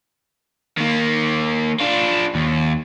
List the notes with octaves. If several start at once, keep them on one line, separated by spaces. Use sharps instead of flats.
D#3 A#3
D4 F4
D#2